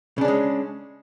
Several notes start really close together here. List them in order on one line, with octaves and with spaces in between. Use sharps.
C#3 D4 C#4 G#3